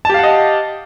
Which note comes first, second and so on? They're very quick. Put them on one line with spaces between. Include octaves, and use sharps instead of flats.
A5 G4 F5 F#5 D#5